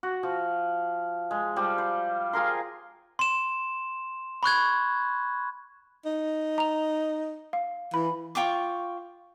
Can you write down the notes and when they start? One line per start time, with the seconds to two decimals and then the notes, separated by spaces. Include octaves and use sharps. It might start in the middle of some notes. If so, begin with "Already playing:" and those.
0.03 F#4
0.23 F3
1.31 G#3
1.56 F3 G3
1.78 C5
2.33 F4 G#4 A#4 C6
3.19 C6 E7
4.43 B5 C#6 F#6 G#6
6.05 D#4
6.58 A#5 F7
7.53 F5
7.94 E3 B5
8.35 F4 G5 C#6 D6